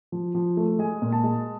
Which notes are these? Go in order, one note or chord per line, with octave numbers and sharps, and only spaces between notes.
F3
F3
A3
G#3 G#5
A#2
A5
G#3